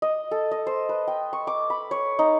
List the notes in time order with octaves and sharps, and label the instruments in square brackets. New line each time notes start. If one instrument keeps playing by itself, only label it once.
[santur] D#5
A4
D#5
C5
B4
G5
C#6
D6
B5
C#5
D#4